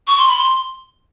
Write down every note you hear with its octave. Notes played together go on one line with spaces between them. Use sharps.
C#6
C6
B5
C6